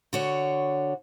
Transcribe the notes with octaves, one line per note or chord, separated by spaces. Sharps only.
D3 F#4 C#5